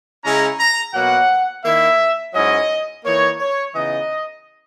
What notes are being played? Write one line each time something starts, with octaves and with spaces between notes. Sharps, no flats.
C#3 G#3 C#4 E4 A#5
A#5
B2 F#3 A#3 F#5
D#3 A#3 E4 E5
G#2 F#3 C#4 E4 D#5
E3 A#3 D#4 C#5
C#5
C#3 E3 B3 D#4 D#5